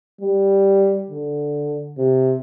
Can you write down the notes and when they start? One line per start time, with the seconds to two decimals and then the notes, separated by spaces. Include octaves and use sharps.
0.21 G3
1.10 D3
1.98 C3